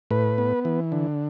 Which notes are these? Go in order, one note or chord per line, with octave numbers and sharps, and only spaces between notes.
A2 B4
B3
E3
D3